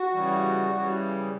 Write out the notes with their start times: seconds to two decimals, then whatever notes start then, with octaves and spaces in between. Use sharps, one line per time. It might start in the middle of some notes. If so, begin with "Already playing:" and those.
Already playing: F#4
0.13 C#3 E3 G3
0.71 C#3 E3 G3